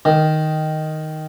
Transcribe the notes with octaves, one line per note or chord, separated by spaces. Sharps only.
D#3